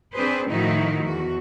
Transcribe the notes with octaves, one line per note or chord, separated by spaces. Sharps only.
C4 D4 G#4 B4 C5
A2 D#3 F3 D#4 E4 F#4
E2 F#4